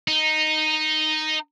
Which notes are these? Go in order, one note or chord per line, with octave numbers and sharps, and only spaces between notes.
D#4